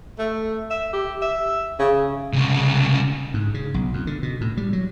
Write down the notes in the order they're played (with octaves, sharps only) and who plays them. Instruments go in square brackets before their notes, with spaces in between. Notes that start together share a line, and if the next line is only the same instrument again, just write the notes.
[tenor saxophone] A3
E5
G4
E5
C#3
[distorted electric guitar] C2 C#3
[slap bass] G#2
C#3
B1
F2
D3
B2
A2
G3
F#3